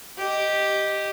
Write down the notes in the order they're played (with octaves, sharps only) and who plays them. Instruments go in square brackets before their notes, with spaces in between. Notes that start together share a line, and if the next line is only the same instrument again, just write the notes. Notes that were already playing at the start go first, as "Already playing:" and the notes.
[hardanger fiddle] G4 D#5